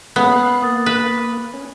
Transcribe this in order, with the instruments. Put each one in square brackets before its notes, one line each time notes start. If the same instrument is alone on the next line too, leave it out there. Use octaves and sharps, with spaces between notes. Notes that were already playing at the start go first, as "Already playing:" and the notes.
[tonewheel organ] G#3 A#3 C#4 [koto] B3 [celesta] B5 D#6
[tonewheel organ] F5 F#6
[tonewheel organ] A#3 [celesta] D#6 A6
[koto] B4
[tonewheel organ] C#4